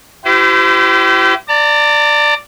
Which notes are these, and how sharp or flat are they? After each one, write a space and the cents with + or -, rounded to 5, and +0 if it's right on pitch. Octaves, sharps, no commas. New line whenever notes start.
E4 +30 G4 -30 C5 -40
D5 +0 A#5 -45